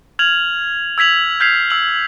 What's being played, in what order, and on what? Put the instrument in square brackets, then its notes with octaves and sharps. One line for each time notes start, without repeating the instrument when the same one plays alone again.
[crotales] F6 G#6 F7 F#7
E6 G#6 B6 F7 F#7
F6 G6 G#6 B6 C7 F7
E6 F#7